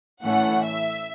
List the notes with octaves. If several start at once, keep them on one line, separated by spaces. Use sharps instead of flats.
A2 E3 A3 C#4 F#5
E5